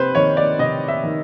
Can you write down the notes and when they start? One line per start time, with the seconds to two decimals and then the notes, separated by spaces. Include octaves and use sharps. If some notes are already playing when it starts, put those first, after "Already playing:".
Already playing: C3 B4 C5
0.15 D#3 C#5
0.37 D5
0.59 C3 D#5
0.88 E5
1.03 D#3